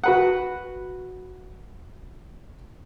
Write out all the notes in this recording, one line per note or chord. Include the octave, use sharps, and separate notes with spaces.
F#4 B4 F#5